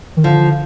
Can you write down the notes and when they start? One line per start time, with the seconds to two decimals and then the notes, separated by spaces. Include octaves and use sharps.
0.17 D#3
0.24 D3 F3